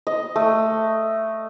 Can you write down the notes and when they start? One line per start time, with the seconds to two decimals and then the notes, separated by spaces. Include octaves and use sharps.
0.07 D#5
0.36 A3